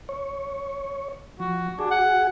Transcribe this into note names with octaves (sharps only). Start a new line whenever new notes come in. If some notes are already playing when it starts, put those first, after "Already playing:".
C#5
F3 F#4
D4 F#4 G#4
F#5